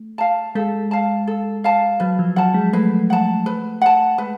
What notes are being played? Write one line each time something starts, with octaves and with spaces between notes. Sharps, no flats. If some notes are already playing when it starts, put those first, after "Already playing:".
Already playing: A3
F5 A5
G#3 A4
F5 A5
A4
F5 A5
F#3 B4
F3
F#3 F#5 A5
G#3
A3 B4
F#5 A5
B4
F#5 A5
G#3 B4